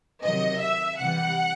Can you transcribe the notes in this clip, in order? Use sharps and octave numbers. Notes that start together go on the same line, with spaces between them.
C3 D#3 F#3 D#5
E5
C3 E3 G3 F#5